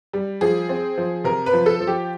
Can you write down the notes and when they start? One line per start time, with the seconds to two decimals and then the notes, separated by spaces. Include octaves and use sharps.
0.13 G3
0.41 F3 G#4
0.69 C4
0.98 F3
1.24 C3 A#4
1.46 B4
1.53 F3
1.66 A4
1.80 F3
1.87 G4